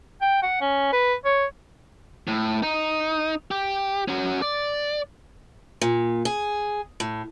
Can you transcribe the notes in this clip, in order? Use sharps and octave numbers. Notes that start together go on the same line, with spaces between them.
G5
F#5
C#4
B4
C#5
A2
D#4
G4
C#4 F#4
D5
A#2
G#4
A2